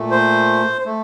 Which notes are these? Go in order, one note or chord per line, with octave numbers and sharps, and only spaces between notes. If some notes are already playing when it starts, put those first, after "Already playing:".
Already playing: A#2 A3
C5
A3